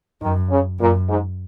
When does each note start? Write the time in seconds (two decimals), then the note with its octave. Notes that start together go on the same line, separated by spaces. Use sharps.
0.21 F#2 D#3
0.50 C#3
0.79 F#2 A#2
1.08 G#2